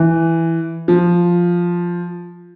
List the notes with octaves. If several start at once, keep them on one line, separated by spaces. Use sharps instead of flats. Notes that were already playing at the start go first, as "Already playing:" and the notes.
Already playing: E3
F3